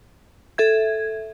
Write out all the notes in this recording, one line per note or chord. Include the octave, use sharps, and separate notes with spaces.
A4 E5 G#6